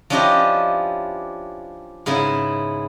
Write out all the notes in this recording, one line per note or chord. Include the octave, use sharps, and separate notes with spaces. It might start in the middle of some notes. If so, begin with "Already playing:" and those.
F3 C#4 D4 E4 G4 D#5
G#2 C#3 B3 E4